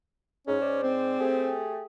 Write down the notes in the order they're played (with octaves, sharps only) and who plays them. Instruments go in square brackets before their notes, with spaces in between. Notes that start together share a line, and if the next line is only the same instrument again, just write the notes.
[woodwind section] G#2 [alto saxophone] C#4
[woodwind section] G#2 C5 D5
[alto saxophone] C4
[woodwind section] A3 G4 G#4